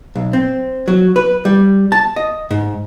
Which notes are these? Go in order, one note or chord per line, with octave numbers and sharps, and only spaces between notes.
B1
C4
F#3
B4
G3
A5
D#5
G#2